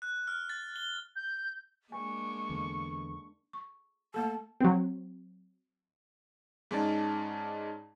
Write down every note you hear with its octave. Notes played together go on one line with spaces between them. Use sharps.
F#6
F6
A6
G7
G6
G#3 A#3 D4 G#5 C#6
E2 D3
C#6
A3 A#3 A4 A5
F#3 C4
G#2 G#3 C#4 D#4 D5 A5